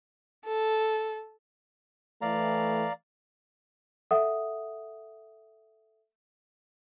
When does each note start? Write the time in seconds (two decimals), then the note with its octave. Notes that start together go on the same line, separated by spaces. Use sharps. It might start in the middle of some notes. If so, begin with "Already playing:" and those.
0.45 A4
2.22 E3 A3 D5 F5 A#5
4.11 A4 E5 F#5 D#6